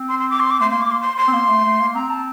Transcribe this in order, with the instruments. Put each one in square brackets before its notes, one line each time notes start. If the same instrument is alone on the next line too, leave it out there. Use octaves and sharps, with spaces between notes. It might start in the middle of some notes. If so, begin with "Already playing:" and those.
Already playing: [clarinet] C4
[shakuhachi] C6
C6
D6
C6
D6
[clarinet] A3 [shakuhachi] C6
[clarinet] A#3 [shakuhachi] C6
[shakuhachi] D6
C6
C6
C6
[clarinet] C4
A#3
A3
A3
A#3
[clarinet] C4 [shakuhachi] A#5
[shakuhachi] A5